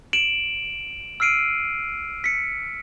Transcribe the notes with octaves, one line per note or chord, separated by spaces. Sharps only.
D7 E7 F#7
E6 F6 C7 D7 D#7
B6 C#7